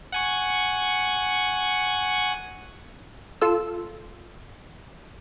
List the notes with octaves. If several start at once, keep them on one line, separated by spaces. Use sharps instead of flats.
F#5 G#5 C#6
F4 A4 E6